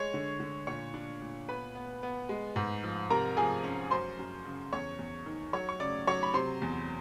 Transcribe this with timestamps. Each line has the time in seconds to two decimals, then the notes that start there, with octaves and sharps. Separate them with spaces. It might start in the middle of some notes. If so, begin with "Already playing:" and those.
Already playing: G#3 C#5 C#6
0.14 D3
0.40 D3
0.67 A#2 C#5 C#6
0.94 D4
1.22 A#2
1.49 B3 B4 B5
1.75 B3
2.03 B3
2.29 G#3
2.56 G#2
2.84 F3
3.10 C3 A#4 A#5
3.37 F3 G#4 G#5
3.64 C#4
3.91 F#2 C5 C6
4.19 F#2
4.45 C#3
4.73 E2 C#5 C#6
4.99 E2
5.26 D#3
5.53 F#3 C#5 C#6
5.69 C#6
5.80 C#3 D5 D6
6.07 F#3 C#5 C#6
6.23 B5
6.34 C3 C5 C6
6.62 E2